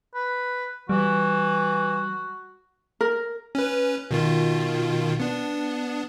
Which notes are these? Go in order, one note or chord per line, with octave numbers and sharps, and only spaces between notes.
B4
E3 G3 F#4
A#4
C#4 B4
B2 D#3 F4
B3 D4